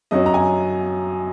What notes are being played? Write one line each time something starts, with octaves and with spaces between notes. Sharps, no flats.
F#2 F#3 C#4 D#5
A#5
G#5